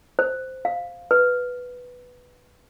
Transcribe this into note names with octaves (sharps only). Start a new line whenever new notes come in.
C5
F5
B4